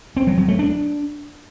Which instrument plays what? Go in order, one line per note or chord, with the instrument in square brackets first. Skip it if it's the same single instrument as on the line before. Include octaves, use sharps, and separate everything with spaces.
[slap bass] C4
F#3
F#3
A3
D4